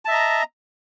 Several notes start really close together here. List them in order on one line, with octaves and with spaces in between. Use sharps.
A5 E5 D#5 A#5